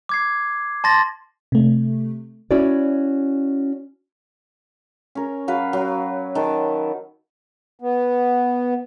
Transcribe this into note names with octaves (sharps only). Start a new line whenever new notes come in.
D6 G#6 C7
A5 C6 A6 A#6
C3 A3
C#4 E4 F#4 C#5 D5
C#4 A#4
F#3 B4 F5
F#3
D#3 A5
B3